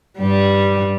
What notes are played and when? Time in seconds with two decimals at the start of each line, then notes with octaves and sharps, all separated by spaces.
0.19 G2 G3